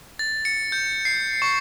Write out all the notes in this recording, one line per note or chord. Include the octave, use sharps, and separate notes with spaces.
A6
C#7
G6
C7
C#6